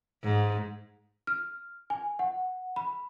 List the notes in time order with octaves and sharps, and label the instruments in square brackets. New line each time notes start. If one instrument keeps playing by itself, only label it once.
[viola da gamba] G#2
[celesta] F6
G#5
F#5
B5